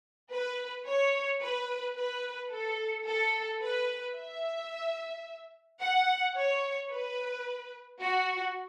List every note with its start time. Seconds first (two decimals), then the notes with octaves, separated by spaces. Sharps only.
0.30 B4
0.85 C#5
1.41 B4
1.95 B4
2.50 A4
3.05 A4
3.61 B4
4.15 E5
5.80 F#5
6.35 C#5
6.90 B4
8.01 F#4